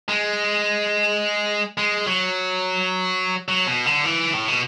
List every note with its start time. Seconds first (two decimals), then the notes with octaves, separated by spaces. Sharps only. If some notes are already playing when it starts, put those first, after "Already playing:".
0.09 G#3
1.78 G#3
2.07 F#3
3.48 F#3
3.67 B2
3.86 D3
4.05 E3
4.34 A2
4.48 B2